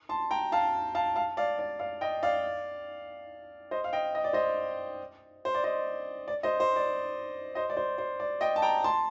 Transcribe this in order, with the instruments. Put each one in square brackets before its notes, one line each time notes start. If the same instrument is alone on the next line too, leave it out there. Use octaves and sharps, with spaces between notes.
[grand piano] A5 C6
G5 A#5
F5 A5
F5 A5
F5 A5
D5 F5
D5
D5 F5
D#5 G5
D5 F5
C5 D#5
F5
D#5 G5
D#5
D5
C5 D#5
C5
D5
C5 D#5
D5
C5 D#5
C5
D5
C5 D#5
D5
C5
C5
D5
D#5 G5
A5
G5 A#5
A5 C6